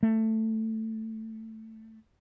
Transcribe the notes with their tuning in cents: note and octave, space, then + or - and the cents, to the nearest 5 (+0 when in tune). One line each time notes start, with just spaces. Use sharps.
A3 +10